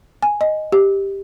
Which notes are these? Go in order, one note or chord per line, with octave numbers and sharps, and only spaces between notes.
G#5
D#5
G4